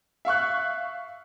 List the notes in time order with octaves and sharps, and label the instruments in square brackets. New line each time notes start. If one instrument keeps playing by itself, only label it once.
[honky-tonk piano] E5 F5 C#6 F#6